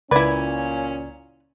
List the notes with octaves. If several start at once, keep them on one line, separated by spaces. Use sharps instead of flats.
C#2 A#2 C#4 E4 B4 D5 G#6